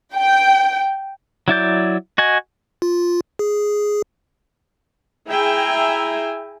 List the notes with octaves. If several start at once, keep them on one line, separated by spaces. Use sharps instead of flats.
G5
F#3 E4 D5 G6
F#4 D#5 G#5
F4
G#4
E4 G#4 E5 G5 G#5 A#5